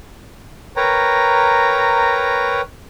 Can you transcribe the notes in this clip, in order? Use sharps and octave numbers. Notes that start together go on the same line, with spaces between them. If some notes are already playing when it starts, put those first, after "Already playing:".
A#4 B4 C#5 G5 A#5